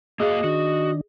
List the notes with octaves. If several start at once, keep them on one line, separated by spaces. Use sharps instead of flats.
A#3 F#4 G#4 D#5 F5
D#3 D4 F#4